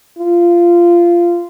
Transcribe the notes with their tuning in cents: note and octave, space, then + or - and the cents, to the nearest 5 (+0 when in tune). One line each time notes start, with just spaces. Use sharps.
F4 -15